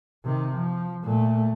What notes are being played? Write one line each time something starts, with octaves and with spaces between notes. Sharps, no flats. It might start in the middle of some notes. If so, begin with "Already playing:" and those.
C3 D#3
F3
A#2 A3